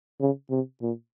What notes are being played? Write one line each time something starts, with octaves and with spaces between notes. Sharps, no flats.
C#3
C3
A#2